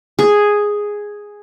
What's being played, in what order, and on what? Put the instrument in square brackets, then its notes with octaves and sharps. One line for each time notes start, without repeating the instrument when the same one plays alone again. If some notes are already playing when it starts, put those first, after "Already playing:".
[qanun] G#4